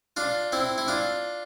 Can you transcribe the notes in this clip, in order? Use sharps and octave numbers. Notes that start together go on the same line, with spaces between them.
D4 F4
C4 E4
E4
D4 F4